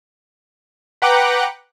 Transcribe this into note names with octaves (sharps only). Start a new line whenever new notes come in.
B4 F#5 G5 A#5 D6 F#6